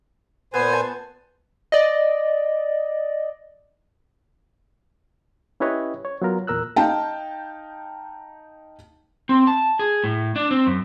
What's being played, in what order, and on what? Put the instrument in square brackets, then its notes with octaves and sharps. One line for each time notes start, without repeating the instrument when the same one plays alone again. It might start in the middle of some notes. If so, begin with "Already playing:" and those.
[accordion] A#2 C5 G#5 [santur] B3
[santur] A5
[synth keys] D5 D#5
[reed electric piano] C#4 E4 G4 B4 C#5 D#5
C#5
F#3 B3 F4 A#4
E2 A#2 A#4 E6 F#6
[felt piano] D#4 F5 G5 A5
[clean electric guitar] C4
A5
G#4
A2
D4
C4
F#2